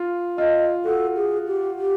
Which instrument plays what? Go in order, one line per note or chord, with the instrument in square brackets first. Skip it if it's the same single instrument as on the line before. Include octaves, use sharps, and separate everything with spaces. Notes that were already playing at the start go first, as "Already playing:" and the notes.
Already playing: [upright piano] F4
[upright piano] F4 [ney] D#5
[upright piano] F#4 [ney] A4
[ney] G#4
G4
G4